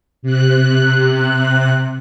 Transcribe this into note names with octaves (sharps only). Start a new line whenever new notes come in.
C3 F#6